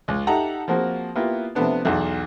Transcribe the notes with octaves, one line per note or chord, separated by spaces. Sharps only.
C#2
D#4 G4 A4 E5 F#5 A#5
F3 A#3 C4 F#4 G#4
A#3 B3 E4 F4 G4
C3 F3 A3 B3 D4
B1 E2 F#5